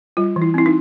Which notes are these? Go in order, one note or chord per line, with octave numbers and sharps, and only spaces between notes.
G3 F4
E3
E4
C4 E4
D#4